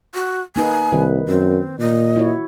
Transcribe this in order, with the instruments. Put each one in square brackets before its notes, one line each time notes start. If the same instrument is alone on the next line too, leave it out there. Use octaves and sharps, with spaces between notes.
[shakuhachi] F#4
[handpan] A#3 D#4 B4 [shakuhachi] G#5
[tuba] C2 [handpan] D#3 B4
[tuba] F#2 [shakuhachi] C4
[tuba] A#2 [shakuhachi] D#5
[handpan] E4 F#4 C#5